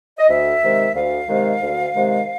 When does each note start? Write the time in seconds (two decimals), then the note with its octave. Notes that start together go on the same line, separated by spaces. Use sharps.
0.18 D#5
0.28 D2 E5
0.61 C3 D#3 G#3
0.94 D2 F5
1.27 C3 D#3 G#3
1.61 D2
1.93 C3 D#3 G#3